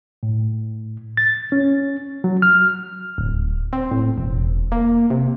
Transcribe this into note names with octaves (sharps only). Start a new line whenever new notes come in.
A2
A6
C#4
F#3
F6
D1
C4
A2
E1
A#3
C3